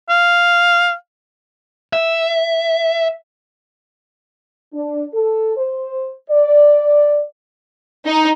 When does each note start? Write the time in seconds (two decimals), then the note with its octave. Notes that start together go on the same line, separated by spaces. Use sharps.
0.09 F5
1.93 E5
4.74 D4
5.13 A4
5.56 C5
6.30 D5
8.06 D#4